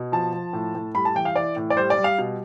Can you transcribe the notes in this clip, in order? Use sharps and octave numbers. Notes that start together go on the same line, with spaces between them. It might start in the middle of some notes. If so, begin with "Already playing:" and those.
Already playing: B2
F3 A5
F3
A2
A2
G3 B5
A5
E3 G5
F5
E3 D5
A2
D5
G3 C5
D5
G3
F5
B2